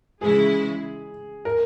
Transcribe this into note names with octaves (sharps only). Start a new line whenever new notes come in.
C#3 E3 G#3 E4 G#4
A#4